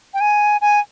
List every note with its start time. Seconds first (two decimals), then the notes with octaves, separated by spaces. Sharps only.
0.14 G5
0.21 G#5
0.61 G#5